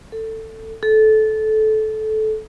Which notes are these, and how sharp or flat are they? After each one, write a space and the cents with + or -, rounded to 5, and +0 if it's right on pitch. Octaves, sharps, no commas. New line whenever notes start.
A4 +15
A4 -20